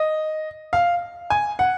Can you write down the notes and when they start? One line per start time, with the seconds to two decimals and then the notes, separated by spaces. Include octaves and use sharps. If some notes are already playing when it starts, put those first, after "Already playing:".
Already playing: D#5
0.73 F5
1.30 G#5
1.59 F#5